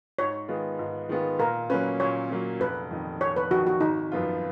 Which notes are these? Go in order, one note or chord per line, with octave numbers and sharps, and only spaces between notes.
G#2 C#5
D#3 G#3 B3 F4
G#2
D#3 G#3 B3 F4
A#2 A#4
F#3 A#3 C#4 B4
A#2 C#5
F#3 A#3 C#4
F1 B4
F2 D#3
F1 C#5
B4
F2 D#3 F#4
F#4
G#1 D#4
F#2 F3 B3 F4